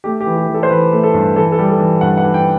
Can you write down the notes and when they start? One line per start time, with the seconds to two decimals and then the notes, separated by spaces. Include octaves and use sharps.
0.04 A3 G4
0.21 G4
0.26 E3
0.37 G4
0.48 E3
0.54 A4
0.63 C5
0.70 E3 B4
0.92 A3
1.03 A4
1.14 G2
1.35 E3 A4
1.52 A4
1.58 G3
1.69 A4
1.79 E3
2.01 G2 F#5
2.18 F#5
2.24 E3
2.34 G5